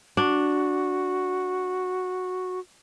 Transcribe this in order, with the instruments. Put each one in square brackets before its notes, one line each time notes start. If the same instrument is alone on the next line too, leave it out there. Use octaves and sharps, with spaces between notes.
[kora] D4 [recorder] F#4